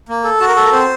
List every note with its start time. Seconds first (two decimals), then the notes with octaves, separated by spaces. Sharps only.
0.09 A#3
0.24 A4
0.40 F#4 A5
0.48 A#4
0.56 A4
0.65 A#4
0.72 C4 C5